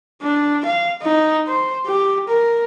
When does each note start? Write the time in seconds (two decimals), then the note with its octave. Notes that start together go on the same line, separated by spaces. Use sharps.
0.23 D4
0.65 F5
1.03 D#4
1.48 C5
1.87 G4
2.29 A#4